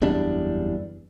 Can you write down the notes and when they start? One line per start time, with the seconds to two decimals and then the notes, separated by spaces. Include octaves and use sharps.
0.02 F#1 E2 G3 D4